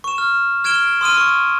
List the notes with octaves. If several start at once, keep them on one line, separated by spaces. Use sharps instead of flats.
C#6 E7
F6
F6 G#6 D7 E7 G7
C6 D#6 F6 D#7
C#6